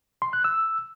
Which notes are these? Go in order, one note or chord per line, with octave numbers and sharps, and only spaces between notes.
C6
F#6
E6